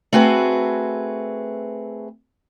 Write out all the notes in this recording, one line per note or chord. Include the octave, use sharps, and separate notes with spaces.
A3 C4 F#4 G#4 B4